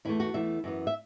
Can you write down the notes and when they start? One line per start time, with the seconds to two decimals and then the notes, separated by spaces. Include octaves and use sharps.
0.05 E2 E3 A3 E4
0.20 F#4
0.34 E2 E3 A3 E5
0.64 F#2 E3 B3
0.87 E5